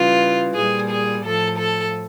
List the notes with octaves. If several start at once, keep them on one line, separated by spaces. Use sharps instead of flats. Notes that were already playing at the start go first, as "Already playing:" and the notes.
Already playing: C#3 E3 G3 F4
A#2 G3 G#4
G#4
A2 F3 A4
A4